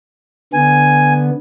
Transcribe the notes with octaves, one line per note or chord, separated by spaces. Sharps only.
D3 B3 G#5